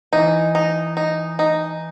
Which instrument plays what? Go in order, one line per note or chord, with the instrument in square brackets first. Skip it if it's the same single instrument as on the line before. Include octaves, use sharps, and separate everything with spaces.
[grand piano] E3 [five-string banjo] D#4
[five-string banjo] D#4
D#4
D#4